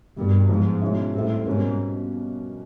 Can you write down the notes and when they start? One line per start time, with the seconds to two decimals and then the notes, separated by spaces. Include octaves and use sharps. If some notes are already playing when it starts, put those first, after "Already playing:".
0.16 G2 B2 G3 A#3
0.49 G#2 F3 G#3 B3
0.81 B2 G#3 C#4 E4
1.14 A2 G3 C4 E4
1.46 G#2 B2 G3 A#3 C#4